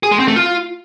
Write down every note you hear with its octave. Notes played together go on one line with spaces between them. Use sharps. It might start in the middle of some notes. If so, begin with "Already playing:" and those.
G#4
G#3
C4
A3
F4